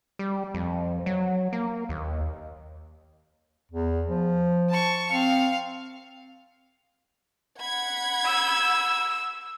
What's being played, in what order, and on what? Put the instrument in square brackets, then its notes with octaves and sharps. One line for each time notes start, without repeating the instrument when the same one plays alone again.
[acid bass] G3
F2
F#3
A#3
D#2
[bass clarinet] E2
F3
[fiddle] A5 C#6
[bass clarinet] C4 [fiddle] F5
[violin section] F#5 B5 G#6
[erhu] E6